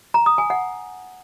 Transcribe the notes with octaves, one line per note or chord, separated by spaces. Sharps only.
A#5
D#6
G#5
F#5